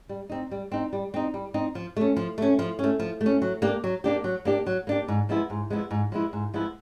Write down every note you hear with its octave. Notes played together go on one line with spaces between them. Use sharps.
G3
C4 D#4
G3
C4 D#4
G3
C4 D#4
G3
C4 D#4
F3
A3 C#4
F3
A3 C#4
F3
A3 C#4
F3
A3
C#4
F#3
A#3 D4 G4
F#3
A#3 D4 G4
F#3
A#3 D4 G4
F#3
A#3 D4 G4
G#2
F3 G#3 B3 E4
G#2
F3 G#3 B3 E4
G#2
F3 G#3 B3 E4
G#2
F3 G#3 B3 E4